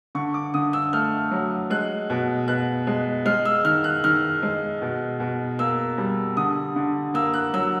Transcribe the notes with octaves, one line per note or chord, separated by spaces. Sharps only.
D3 C#6
D6
D3 D#6
E6
A3 F6
F#3
G#3 F#6
B2
B2 F#6
G#3
G#3 F6
E6
D#3 F6
F#6
D#3 F6
G#3
B2
B2
A#3 E6
G3
D3 D#6
D3
A#3 E6
F#6
F#3 E6